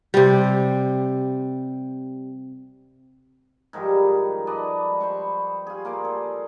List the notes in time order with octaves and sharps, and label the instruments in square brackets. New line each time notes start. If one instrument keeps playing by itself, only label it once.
[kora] C3 G3
[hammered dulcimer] G#2 D#3 F3 G3
B4 D5 D#5 A5
C5 B5 C#6
F4 G#4
A#3 F4 D5
G#4 A4